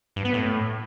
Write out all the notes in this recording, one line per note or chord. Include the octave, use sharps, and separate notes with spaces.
G2
B3
A2